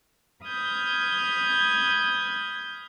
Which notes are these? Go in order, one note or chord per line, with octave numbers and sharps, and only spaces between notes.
B5 D#6 F6 G6 G#6